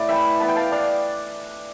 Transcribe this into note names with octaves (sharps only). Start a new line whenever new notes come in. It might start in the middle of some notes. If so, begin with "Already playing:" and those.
Already playing: A2 D5
E3 E5 G5
B3 A5
G5
F5 A5
D4 D5 F5